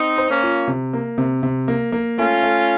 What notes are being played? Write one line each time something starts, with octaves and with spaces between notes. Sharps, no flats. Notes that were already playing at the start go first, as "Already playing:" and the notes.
Already playing: C4 D#4
C5
A#3 C#4
F4
C3
A#3
C3
C3
A#3
A#3
A3 C#4 F4
A3